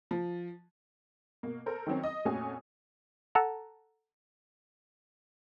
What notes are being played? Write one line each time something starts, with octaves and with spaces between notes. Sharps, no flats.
F3
B2 A#3
A4 A#4 C5
D#3 F#3 C4 C#4
D#5 D#6
F2 A#2 A3 C#4 F#4 G#5
A4 F#5 A5 A#5